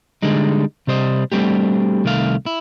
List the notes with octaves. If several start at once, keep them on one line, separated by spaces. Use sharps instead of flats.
D3 G3 G#3 D#4
C3 G3 C5 D#5
G3 A3 C4 D4 F#4 G4
C2 D#3 A3 F5
E4